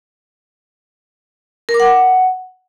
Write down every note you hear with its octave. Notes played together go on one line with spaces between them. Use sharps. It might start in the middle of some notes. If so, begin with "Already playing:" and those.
A#4
D6
F#5